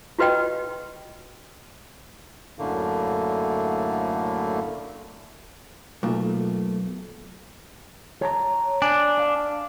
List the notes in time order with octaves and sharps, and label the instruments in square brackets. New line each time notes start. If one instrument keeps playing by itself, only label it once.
[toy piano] F4 F#4 B4 D#5 G5
[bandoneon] F#2 A2 D3 A3 A#3
[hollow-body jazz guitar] B1 [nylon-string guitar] A3 A#3 F4
[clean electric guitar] C#5 A5 A#5
[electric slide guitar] D4 [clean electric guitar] G#5
[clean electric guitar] D5 F5